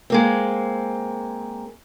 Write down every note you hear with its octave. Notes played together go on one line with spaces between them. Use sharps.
G#3 A#3 C4